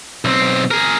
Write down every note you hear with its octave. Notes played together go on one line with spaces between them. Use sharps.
B1 C4
G#4 A#4